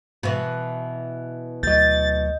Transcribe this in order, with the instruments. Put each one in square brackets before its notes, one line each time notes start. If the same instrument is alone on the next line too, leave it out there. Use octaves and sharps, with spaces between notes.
[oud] B2 E3
[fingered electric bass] D2 F#3 [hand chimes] D#5 G6 [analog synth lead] A6